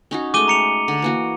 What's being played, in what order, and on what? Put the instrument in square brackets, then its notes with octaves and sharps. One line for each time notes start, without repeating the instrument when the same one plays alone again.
[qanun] C#4 D#4 F#4
[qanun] G#3 A3 [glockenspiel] D6 D#7 G7
[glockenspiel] A#5 C#7 F7
[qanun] D3
E3 A#3 F#4